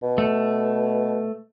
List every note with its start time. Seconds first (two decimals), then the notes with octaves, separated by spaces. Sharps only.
0.02 B2
0.18 A3